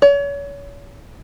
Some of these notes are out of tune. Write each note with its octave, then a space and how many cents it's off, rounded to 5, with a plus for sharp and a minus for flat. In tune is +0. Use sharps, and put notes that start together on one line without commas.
C#5 +35